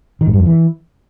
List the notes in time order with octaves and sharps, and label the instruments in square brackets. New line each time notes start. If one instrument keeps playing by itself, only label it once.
[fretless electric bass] D#3
G#2
G2
F2
E3